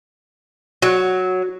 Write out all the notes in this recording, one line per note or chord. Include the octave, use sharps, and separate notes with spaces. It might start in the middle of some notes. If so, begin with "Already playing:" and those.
F#3 F#4